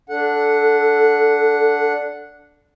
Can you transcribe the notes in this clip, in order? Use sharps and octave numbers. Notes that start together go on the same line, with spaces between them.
D4 A4 F#5